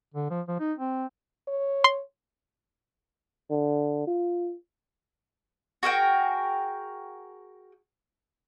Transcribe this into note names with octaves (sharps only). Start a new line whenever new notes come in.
D3
F3
F3
D#4
C4
C#5
C6
D3
F4
F#4 G#4 A#4 G5